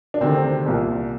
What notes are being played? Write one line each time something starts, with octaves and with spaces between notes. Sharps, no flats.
D4
D2 C3 D#3 C4
C2 A#2